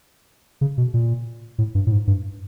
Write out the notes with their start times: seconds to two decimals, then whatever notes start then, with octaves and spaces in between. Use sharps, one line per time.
0.61 C#3
0.78 B2
0.94 A#2
1.58 A2
1.75 G2
1.87 A2
1.92 G#2
2.07 G2